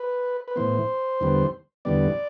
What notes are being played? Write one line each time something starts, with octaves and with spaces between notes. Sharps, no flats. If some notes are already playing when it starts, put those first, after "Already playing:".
Already playing: B4
B4
A2 E3 B3 C5
E2 D3 G3 B3
E2 D3 G3 B3 D5